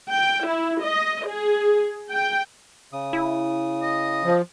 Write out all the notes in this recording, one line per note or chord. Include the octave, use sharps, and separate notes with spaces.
G5
E4
D#5
G#4
G5
C#3 D#6
E4
D#5
F3